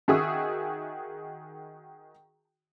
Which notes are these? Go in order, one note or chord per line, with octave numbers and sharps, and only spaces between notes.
D#3 F#4 G#4 E5 C#6 D#6